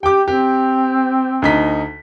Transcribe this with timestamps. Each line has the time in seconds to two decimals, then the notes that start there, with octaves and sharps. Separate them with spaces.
0.03 G4 G5 D6
0.28 C4 G4
1.42 D2 D#4 B6